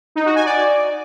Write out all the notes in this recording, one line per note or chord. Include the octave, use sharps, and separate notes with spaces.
D#4
F#4
G#5
D5